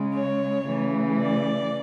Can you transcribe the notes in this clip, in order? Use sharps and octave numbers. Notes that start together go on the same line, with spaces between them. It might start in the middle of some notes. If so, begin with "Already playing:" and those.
Already playing: C#3 G#3
C#5
C#3 E3 A3
D5